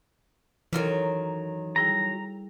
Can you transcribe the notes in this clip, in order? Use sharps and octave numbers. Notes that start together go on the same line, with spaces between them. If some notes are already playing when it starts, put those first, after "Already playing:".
F#2 D#3 E3 F#3 A4 A#4 F6
G3 E4 G#4 A#5